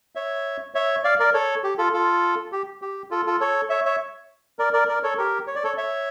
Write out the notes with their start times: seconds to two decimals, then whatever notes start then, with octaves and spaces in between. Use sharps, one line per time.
0.15 C#5 E5
0.74 C#5 E5
1.04 D5 F5
1.20 A#4 D5
1.34 A4 C#5
1.64 G4
1.78 F4 A4
1.93 F4 A4
2.52 G4
2.82 G4
3.11 F4 A4
3.26 F4 A4
3.40 A4 C#5
3.70 C#5 E5
3.86 C#5 E5
4.59 A#4 D5
4.73 A#4 D5
4.89 A#4 D5
5.03 A4 C#5
5.18 G4 A#4
5.47 C#5
5.55 D5
5.64 A4 C#5
5.78 C#5 E5